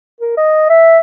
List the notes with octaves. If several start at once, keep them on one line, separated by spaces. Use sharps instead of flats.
A#4
D#5
E5